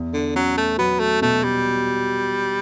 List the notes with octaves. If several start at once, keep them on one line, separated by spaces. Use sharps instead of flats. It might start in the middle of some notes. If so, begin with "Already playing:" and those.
Already playing: E2
D3
F#3 C#4
A3
F#3 B3
A3
B2 A3
G3